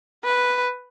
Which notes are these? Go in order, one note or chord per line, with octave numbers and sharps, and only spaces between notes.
B4